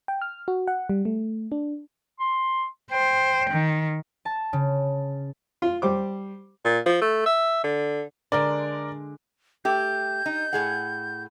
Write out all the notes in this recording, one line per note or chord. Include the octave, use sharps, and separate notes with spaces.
G5
F6
F#4
F#5
G3
A3
D4
C6
C5 G5
D#3
A5
C#3
F4
G3 C5 D6
A#2
F3
A3
E5
D3
D3 G#3 A#4 D5 C6
A3 G4 G6
D#4
A2 G#4 F#5